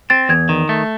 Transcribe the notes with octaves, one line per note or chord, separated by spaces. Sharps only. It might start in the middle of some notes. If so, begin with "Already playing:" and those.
C4 A6
E2 G#6
D#3
A3